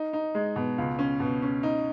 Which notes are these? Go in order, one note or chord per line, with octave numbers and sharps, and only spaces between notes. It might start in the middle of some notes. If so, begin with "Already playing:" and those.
Already playing: D#4
D#4
G#3
B2
C#2
C#4
B2
C#4
D#4